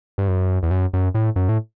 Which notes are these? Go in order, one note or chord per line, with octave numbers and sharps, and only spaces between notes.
G2
F#2
E2
F#2
F#2
A2
F#2
A2